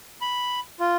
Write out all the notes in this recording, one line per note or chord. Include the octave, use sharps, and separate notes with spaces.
B5
F4